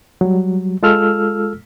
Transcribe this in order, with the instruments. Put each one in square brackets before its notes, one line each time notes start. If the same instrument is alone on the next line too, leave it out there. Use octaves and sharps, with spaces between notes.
[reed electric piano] F#3 G3
G#3 F4 A4 E6 F6